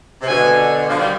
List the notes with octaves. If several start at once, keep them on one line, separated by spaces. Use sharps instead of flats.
C3
B2 D3 G#5
D3 F3
D#3 G3